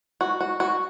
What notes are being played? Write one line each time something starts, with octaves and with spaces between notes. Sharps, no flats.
F#4
F#4
F#4